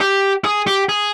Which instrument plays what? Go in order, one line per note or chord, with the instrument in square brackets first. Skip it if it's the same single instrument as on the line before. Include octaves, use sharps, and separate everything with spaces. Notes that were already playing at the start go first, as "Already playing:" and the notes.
[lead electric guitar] G4
G#4
G4
G#4